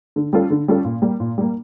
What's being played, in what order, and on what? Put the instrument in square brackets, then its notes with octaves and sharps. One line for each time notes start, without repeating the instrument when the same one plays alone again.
[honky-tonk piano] D3
G3 C#4 F4 A4
D3
G3 C#4 F4 A4
A#2
G3 A#3
A#2
G3 A#3